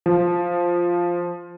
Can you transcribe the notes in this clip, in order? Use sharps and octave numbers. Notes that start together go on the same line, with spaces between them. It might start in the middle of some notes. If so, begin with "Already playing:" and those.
F3